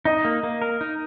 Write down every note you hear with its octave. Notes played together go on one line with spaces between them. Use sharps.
D#4 D#5
A#3
A#3
A#4
D#4